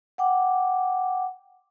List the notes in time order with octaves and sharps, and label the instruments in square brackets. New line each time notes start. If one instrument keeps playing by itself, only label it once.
[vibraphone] F#5 G5 D6